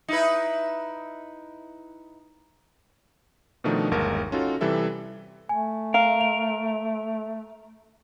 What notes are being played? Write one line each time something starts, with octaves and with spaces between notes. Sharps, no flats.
D#4 E4 B4
B2 D#3 F3 A3 D4 D#4
G1 D#2 G#3 A#4
C#4 D#4 F4 F#4 A4
C3 E3 G3 A4 E5
A3 G#5
A#4 F5
F7